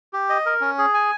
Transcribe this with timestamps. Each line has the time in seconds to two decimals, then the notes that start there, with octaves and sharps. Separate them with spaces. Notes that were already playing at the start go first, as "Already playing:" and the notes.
0.13 G4
0.29 D#5
0.46 A#4
0.61 C#4
0.78 G#4
0.94 G#5